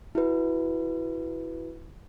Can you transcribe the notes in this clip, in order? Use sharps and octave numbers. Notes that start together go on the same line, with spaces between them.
E4 F#4 B4